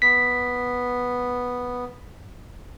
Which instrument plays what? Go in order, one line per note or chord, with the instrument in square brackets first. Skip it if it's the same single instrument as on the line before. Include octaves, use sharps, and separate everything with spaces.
[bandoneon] B3 [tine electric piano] B6